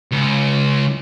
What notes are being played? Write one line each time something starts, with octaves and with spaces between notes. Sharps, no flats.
C#2